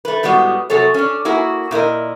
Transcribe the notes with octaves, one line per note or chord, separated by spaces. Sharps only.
A3 B4
A2 G3 G#3 B3 F#4
C3 F#3 G#4 A4 C#5
C#4 D4
A#3 E4 F#4 G#4
A#2 E4 A#4 D#5